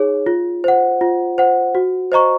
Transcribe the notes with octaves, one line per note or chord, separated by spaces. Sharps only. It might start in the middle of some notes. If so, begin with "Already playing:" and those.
Already playing: D#4 G#4 C#5
F4
C5 F#5
F4
C5 F#5
F#4
C5 D#5 A#5 C#6